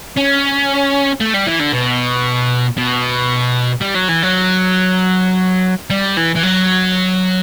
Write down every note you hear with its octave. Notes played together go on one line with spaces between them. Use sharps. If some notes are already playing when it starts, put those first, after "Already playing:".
C#4
A3
G3
E3
D3
B2
B2
G3
F#3
E3
F#3
G3
E3
E3
F#3